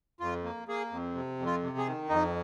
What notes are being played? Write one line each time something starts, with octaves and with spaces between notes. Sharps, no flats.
F2 F4
A#3
A#3 G#4
F2
C3
F2
F4
C3
G#4
D#3
F2 D#4